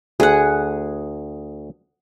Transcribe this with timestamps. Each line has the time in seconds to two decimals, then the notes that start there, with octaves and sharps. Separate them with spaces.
0.20 D2 G#4 F#5